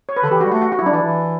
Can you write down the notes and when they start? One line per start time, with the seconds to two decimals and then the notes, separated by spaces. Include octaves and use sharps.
0.09 C#5
0.16 B4
0.23 D3 A4
0.30 E3 G4
0.41 F#4
0.44 G3
0.52 A3 F#4
0.62 F#4
0.72 F#4
0.79 E4
0.82 F#3
0.86 D4
0.93 E3 E4
1.03 E3